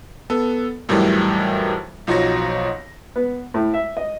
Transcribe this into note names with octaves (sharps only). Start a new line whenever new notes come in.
B3 A4
F2 A2 D#3 E3 F#3 G3
B1 F3 D#4 F#4 C#5 A#6
B3
A2
E5
D#5